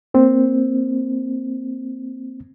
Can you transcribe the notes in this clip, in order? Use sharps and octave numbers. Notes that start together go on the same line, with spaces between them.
A#3 C4